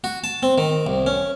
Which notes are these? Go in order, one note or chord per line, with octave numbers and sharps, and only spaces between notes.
F#4
A5
C4
D#3
C2
C#4